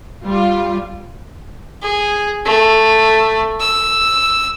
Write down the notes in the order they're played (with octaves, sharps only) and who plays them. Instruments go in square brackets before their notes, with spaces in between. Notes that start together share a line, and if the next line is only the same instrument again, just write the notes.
[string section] G3 F4
[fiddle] G#4
A3
E6